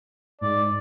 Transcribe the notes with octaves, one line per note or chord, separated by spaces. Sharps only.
G#2 D5